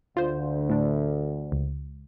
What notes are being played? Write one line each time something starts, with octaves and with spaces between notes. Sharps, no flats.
D2 F4 C5
A2 D4
C#2